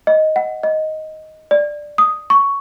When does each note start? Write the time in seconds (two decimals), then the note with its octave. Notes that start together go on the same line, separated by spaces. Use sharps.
0.07 D#5
0.36 F#5
0.63 D#5
1.51 D5
1.98 D#6
2.30 C#6